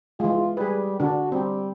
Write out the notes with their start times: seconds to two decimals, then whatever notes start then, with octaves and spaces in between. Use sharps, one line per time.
0.20 E3 G#3 F4
0.57 G3 G#4 B4
1.00 D3 D4 F#4
1.32 G3 C4